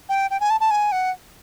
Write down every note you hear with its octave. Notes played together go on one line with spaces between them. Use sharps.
G5
G5
G#5
A5
A5
G#5
F#5